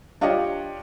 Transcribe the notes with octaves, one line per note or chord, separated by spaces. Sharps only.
D4 F4 G4 C#5 D#5